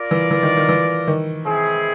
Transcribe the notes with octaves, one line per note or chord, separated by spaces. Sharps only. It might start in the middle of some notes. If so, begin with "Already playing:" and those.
Already playing: F4 A#4 D5
E3
E3
D#3
D#3
E3
D#3
C4 E4 G#4